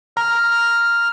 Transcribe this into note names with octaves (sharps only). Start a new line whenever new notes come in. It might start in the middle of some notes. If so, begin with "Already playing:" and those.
A#5 F6